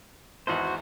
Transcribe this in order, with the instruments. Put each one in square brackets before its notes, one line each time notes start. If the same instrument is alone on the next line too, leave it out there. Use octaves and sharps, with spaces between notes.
[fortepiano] G#1 E2 [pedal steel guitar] F#4 C5